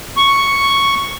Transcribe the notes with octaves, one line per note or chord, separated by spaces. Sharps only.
C#6